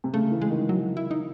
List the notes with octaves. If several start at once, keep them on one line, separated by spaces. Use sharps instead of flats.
C3
C#3 A3
E3
G#3
D#3
F#3
E4
D#4